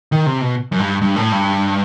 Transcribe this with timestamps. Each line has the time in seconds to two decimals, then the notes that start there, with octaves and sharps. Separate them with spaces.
0.12 D#3
0.26 C3
0.41 B2
0.72 F#2
0.79 G2
1.02 G2
1.16 A2
1.32 G2